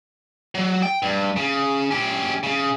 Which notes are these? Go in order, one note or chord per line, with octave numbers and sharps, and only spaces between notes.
F#3
G5
G2
C#3
C#4 G4
C#3